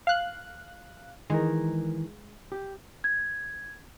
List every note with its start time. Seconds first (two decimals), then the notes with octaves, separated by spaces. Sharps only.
0.07 F5 F#6
1.30 D#3 E3 G#3 A#4
2.52 G4
3.04 G#6